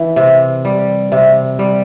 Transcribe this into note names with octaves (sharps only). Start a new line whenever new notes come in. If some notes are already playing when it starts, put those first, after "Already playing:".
Already playing: E3
C3
G3
C3
G3